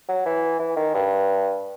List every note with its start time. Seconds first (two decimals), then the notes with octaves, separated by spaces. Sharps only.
0.09 F#3
0.26 E3
0.59 E3
0.76 D#3
0.94 G2